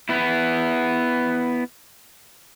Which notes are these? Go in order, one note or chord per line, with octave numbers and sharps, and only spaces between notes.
B3 E4